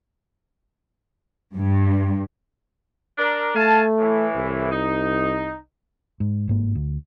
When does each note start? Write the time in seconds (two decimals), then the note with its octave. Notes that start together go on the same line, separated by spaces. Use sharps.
1.56 G2
3.18 D4 A#4
3.56 A3 F5 G#5 A5
3.98 A2 E3
4.36 C2
4.71 D#4
6.20 G#2
6.48 G1 G#2 A#3
6.75 D2